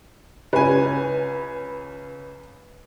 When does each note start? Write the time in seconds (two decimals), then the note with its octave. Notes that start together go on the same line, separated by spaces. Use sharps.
0.53 C#2 C#4 B4 G#5